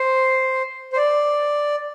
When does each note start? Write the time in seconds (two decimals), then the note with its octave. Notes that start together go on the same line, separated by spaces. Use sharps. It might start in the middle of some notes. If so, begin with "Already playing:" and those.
Already playing: C5
0.93 C5
0.97 D5